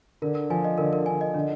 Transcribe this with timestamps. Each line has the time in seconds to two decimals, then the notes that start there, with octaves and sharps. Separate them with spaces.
0.22 D3 A#4
0.35 A#4
0.50 F3 G#5
0.65 D#5
0.78 D3 A#4
0.93 A#4
1.06 D3 G#5
1.21 D#5
1.34 D3 D4